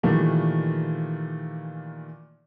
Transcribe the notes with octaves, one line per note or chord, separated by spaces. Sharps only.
A#2 D#3 E3 G3 A3 A#3